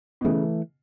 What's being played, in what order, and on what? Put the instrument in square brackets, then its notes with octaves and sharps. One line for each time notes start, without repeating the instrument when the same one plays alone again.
[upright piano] B2
[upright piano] C#3 [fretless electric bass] E3 A3